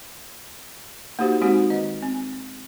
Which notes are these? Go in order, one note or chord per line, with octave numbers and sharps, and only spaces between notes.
A#3 D#4 F#4 G4 C5
G#3 C4 D#4 F#4
D#3 D#5
C4